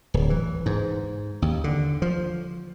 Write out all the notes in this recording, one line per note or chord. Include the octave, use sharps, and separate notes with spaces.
D1
E3
G#2
D#2
D3
F3